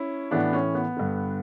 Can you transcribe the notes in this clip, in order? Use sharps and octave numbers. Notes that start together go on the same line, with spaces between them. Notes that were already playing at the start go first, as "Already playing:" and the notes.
Already playing: C#4 E4
A2 E3 B3 D4
C#4
B3
G2 D3